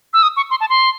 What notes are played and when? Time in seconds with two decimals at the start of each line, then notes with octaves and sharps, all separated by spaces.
0.13 E6
0.23 D#6
0.37 C#6
0.50 C6
0.60 A5
0.70 C6